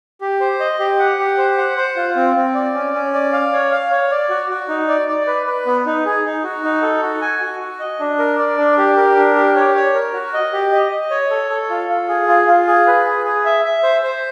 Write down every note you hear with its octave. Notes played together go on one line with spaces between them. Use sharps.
G4
C5
D#5
G4
F#5
G4
C5
F#5
C5
F4
C4
C4
D5
C#4
C#4
D5
F5
C#5
F5
C#5
D5
F#4
F#4
D#4
D5
D5
B4
B4
B3
D#4
G#4
D#4
F#4
D#4
A4
F#4
G#5
F#4
F#4
D#5
D4
A#4
D5
D4
G4
A#4
D4
G4
C#5
C#5
A#4
F#4
D#5
G4
D#5
D#5
C#5
A4
A4
F4
F4
G#4
F4
F4
G#4
B4
G#4
G#4
E5
E5
C5
C5